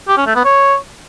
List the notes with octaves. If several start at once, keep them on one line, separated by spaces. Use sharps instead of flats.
G4
C#4
A3
B3
C#5